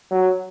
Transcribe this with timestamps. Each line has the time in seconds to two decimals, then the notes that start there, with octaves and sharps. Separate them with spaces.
0.11 F#3